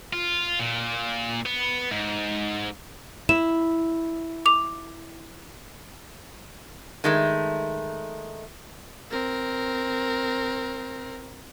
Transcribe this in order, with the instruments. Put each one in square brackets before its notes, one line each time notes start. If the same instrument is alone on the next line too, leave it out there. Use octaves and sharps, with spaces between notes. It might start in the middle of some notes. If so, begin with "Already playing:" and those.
[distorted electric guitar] F4
A#2
B3
G#2
[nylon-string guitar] E4 [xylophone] E7
[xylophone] D6 F7
[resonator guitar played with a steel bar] D#3 G#3 A3
[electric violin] C4 A#4